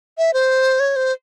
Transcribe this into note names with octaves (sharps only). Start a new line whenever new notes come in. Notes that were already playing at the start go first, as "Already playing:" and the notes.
E5
C5
C#5
C5